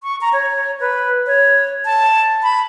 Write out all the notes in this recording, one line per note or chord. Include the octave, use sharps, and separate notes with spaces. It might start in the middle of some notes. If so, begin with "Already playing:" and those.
C#6
A#5
C#5
B4
C#5
A5
B5